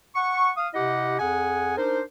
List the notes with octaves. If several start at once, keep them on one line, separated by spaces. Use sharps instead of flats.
F#5 C#6
F5 D#6
C3 E4 G4 D#5 F#5
F2 G#4 F#5 G#5
D4 D#4 A#4 C5